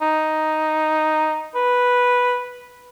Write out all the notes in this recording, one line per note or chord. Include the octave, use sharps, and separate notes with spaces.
D#4
B4